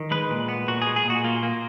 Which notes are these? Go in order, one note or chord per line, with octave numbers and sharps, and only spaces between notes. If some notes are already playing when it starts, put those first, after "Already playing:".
Already playing: D#3
G#3 B4
A#2
B3
A#2 F#4
G#3 G#4
G#4
A#2
F#4
A#3 F4
A#3